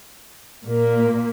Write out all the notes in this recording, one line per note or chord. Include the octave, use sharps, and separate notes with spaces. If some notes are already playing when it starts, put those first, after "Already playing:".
A#2 A#3